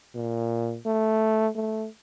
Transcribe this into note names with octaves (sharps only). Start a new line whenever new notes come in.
A#2
A3
A3